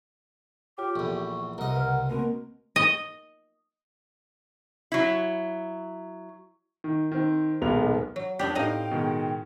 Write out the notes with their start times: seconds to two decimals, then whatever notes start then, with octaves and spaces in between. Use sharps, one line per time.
0.78 F4 G4 C#5 D6
0.96 A#1 E2 A4 C#6
1.58 C2 A#4 D#5 F#5
1.76 C#3 B4 F6
2.09 B2 A3 A#3 C4 A#4
2.76 D#5
4.92 F#3 E4
6.84 D#3
7.12 D#3 C4
7.62 D#1 B1 G#3 B3 A#4 F7
8.16 F#3
8.39 F2 B3 D4 G4 G5
8.55 A2 C4 D#4 G4 D#5 F5
8.91 B2 D#3 G#3